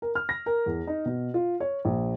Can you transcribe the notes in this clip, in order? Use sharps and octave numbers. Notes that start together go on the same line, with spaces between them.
A#4
F6
A#6
A#4
E2
D#4
B2
F4
C#5
A#1